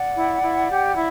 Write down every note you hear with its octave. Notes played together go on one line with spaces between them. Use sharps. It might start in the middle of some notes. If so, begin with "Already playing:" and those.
Already playing: D5 F#5
E4
E4
G4
E4